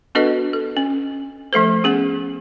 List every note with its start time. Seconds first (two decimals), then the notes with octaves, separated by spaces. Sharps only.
0.15 B3 D4 F#4 A4 B4 D#5
0.53 A4
0.77 C#4
1.53 F3 A3 A4 C5
1.84 B3 C#4 G#4